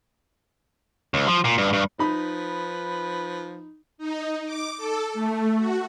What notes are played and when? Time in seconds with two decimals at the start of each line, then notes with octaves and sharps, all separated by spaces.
1.14 C#2
1.28 F3
1.45 A#2
1.58 G2
1.73 G2
1.99 F3 D#4 B4 B5
3.98 D#4
4.45 D6
4.77 A4
5.14 A3
5.57 F#4